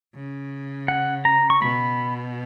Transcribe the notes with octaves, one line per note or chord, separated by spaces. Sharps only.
C#3
F#5
A#5
C#6
B2 B5